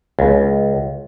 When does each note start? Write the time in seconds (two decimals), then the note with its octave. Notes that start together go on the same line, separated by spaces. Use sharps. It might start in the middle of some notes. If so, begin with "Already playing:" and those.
0.19 C#2